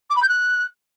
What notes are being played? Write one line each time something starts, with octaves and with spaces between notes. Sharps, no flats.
D6
B5
G6
F#6